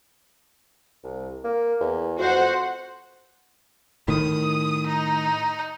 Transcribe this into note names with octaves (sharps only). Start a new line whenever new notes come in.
C2
A#3
E2
F2 F#4 C5 F#5
A2 D#3 D#6
D#4